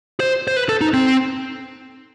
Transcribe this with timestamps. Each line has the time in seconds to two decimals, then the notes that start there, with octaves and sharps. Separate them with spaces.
0.20 C5
0.48 C5
0.56 B4
0.69 A4
0.81 D#4
0.94 C4